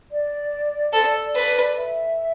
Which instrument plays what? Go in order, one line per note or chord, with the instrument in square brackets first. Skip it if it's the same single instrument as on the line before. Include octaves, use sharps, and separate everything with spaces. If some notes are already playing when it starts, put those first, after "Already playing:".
[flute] D5
[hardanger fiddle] A4 [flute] C5
[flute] D5
D5
[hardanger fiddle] B4
[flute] E5